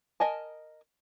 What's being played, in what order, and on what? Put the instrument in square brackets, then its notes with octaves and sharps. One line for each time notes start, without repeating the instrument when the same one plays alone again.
[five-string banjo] A#4 D#5 G#5 A5